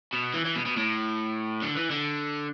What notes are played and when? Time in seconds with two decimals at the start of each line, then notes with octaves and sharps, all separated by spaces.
0.13 B2
0.34 E3
0.45 E3
0.56 B2
0.66 B2
0.77 A2
1.62 D3
1.76 E3
1.90 D3